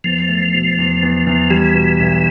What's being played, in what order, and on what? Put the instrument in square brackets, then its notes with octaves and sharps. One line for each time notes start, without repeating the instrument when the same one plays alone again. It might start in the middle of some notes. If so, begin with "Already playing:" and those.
[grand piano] E2 [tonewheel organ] F3
[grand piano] A3
B2
E2
E2
E2
[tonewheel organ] E3 [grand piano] G3
[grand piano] B2
B1